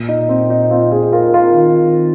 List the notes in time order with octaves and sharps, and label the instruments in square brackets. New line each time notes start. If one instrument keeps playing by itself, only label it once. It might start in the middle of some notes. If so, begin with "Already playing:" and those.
Already playing: [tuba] A#2
[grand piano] D#4
C4
D#4
C4 F4
D#4 G#4
F4 A#4
F4 A#4
[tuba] D#3